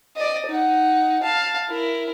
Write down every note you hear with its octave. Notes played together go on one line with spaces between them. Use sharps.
D5 D#5
D#4 F#5
F5 A5
E4 A#4